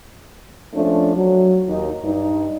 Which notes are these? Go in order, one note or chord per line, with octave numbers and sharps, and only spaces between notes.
F3 A3 C#4 D4
F#3
D#2 D#4
G2 D#4